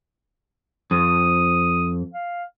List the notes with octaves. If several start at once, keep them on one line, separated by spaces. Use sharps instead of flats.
F2 D#6
F5